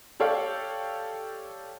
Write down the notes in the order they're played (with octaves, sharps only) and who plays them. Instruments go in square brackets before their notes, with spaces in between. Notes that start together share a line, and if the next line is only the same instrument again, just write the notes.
[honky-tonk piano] G4 A4 C#5 D5 F5